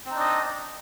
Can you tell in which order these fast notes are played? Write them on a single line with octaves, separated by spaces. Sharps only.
C4 D#4 D4 D#5